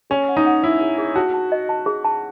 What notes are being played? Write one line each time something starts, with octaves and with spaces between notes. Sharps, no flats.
C#4 G#4
F#5
D#4
F#5
E4 C#5
G#4
G#4
F#4 A5
A5
D#5
A5
G#4
A5